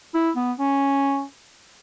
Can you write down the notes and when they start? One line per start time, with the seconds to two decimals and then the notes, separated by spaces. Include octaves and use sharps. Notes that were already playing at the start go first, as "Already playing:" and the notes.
0.15 E4
0.36 B3
0.59 C#4